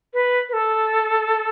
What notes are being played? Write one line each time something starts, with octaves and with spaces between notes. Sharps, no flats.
B4
B4
A4